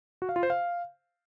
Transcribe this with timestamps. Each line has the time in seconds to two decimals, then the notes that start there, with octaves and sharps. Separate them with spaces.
0.22 F#4
0.29 F5
0.36 F4
0.43 C5
0.50 F5